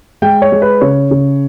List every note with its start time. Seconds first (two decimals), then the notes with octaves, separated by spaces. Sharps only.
0.22 G#3 G5
0.42 C#5
0.52 G#3
0.62 B4
0.81 C#3 C#5
1.11 C#3